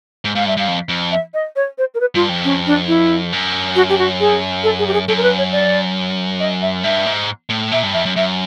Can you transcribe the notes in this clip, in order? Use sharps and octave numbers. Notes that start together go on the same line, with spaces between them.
G#2
G#2 F5
G2 E5
G2 F5
F2
F2
E5
D#5
C#5
C5
A#4
B4
G2 F4
F2
C#4
D4
E4
F#2
F#4
G4
F#4
G#4
A4
G#4
G4
G#4
F#2 A4
A#4
B4
C#5
D5
D#5
E5
G2 E5
G#2
A2
A#2 E5
G2
F2 E5
F#2
F#2 E5